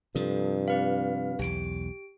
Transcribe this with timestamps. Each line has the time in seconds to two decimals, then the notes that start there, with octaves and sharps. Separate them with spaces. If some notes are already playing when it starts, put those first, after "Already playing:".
0.15 G2 C3 F3 A4
0.68 C4 B4 F5
1.39 B1 E2 G4 D7